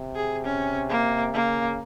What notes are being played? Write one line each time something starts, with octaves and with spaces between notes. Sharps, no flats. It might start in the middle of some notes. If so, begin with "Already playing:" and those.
Already playing: C3
G#4
C#4
A#3
C#3 A#3